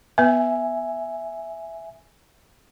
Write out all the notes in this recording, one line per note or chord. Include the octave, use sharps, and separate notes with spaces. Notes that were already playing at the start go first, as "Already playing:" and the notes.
B3 B4 E5 G#5